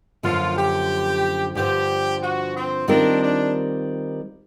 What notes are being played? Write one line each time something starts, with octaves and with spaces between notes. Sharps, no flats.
F#2 D3 F3 A#3 F4
G4
G2 D3 F3 G4
F#4
C4
D#3 G3 C4 D4 F4 A#4
D4